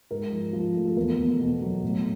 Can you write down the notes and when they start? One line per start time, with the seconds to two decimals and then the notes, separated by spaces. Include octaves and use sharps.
0.11 G#2 A#4
0.32 F3
0.53 F3
0.75 A3
0.85 A4
0.97 E2 A#4
1.18 E2
1.40 B2
1.62 F#3
1.83 A2